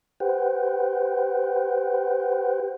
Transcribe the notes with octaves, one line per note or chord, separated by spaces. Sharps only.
G4 B4 C5 F#5 G5